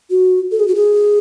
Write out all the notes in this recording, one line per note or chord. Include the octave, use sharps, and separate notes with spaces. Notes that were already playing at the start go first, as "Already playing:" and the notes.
F#4
A4
G#4
F#4
G#4